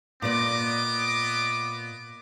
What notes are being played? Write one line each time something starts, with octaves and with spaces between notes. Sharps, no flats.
A#2 B3 D5 D#5 D6